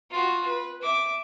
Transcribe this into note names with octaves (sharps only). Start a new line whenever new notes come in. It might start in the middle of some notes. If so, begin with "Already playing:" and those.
F4 F#4
B4
E5 D6